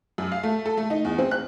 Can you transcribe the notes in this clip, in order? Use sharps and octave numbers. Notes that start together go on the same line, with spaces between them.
F#2
F5
A3
A4
A3
D#4
E2
C4
F#6